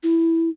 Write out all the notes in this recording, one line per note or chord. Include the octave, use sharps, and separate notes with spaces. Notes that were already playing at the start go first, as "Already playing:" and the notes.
E4